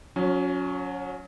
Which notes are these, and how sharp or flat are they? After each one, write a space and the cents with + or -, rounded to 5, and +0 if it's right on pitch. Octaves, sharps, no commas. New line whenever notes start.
F#3 -30 C#4 +15